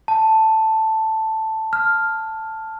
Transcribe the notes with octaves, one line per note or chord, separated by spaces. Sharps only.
A5
F6